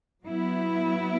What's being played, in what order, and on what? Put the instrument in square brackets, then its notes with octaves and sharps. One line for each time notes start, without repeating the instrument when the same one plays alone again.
[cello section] F#3 B3 E4